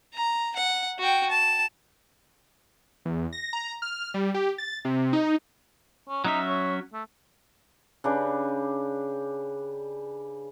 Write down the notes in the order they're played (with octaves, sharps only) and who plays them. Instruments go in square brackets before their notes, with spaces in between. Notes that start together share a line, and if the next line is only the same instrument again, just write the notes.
[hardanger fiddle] A#5
F#5
F#4 G5
A5
[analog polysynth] E2
A#6
A#5
F6
G3
G4
A6
C3
D#4
[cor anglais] C#4
[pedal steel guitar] F#3 C#4 E5 [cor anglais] D#4
[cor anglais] C#5
A3
[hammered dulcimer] C#3 D4 G4 B4